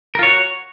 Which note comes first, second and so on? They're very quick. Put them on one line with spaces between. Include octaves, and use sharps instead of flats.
A#4 F4 C#5 F#4